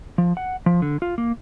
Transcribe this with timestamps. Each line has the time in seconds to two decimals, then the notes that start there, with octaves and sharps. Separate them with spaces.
0.18 F3
0.37 F#5
0.66 F3
0.82 D3
1.02 F4
1.18 A#3